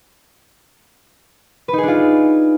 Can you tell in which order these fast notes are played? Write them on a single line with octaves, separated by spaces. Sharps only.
B4 D#4 G#4 D4 F4